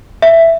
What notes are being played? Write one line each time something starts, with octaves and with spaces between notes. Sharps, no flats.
E5